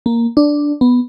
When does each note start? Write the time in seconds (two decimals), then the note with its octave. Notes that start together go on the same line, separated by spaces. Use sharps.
0.06 A#3
0.37 D4
0.81 B3